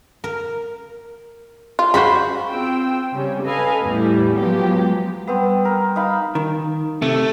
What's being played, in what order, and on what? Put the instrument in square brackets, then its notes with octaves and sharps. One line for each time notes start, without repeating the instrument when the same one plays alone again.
[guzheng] A#4
[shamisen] F4
[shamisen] C#3 G#3 F#4 [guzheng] C5 F5 B5
[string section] C4 F4 G5 E6
C#3 G3 C#4
A4 B4 D#5 F5 G#5
E2 A2 E3 G3 E4
F3 F#3 G#3 B3 G4
[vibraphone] G3 [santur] B3 C4
[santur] A#4
D#4 F5 B5
[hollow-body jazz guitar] D#3
[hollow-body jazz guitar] C3 [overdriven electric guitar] A3